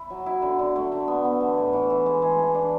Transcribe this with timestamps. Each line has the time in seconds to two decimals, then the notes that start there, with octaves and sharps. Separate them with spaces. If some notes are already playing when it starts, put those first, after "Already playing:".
Already playing: E4
0.10 F#3
0.26 E4
0.42 D3
0.59 D3
0.76 A3
0.92 D3
1.08 B3
1.25 B3
1.40 E3
1.57 A2
1.73 E3
1.90 E3
2.06 G#3
2.22 G#3
2.39 E3
2.55 D4